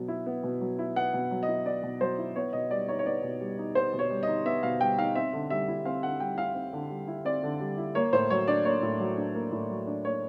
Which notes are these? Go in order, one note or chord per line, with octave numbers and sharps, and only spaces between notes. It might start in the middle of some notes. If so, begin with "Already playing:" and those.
Already playing: B2 F#3 B3
E4
B3
B2
F#3
E4
B3 F#5
B2
F#3
D#5
E4
B3 D5
B2
F#3 C5
E4
B3 C#5
B2 D#5
G3 D5
D#4 C#5
C#5
B3 D5
B2
G3
D#4
B3 C5
B2
C#5
G3
D#5
D#4
B3 E5
B2 F5
G3 G5
D#4 F5
C4 E5
D3
G3 E5
E4
C4 F5
D3 F#5
G3 G5
E4 F5
C4
D3
G3
E4
C4 D5
D3
G3
E4
A#3 C#5
A2 C5
F#3 C#5
D4 D5
A#3 C#5
A2
F#3
D4
A#3
A2
F#3
D4
A#3 C#5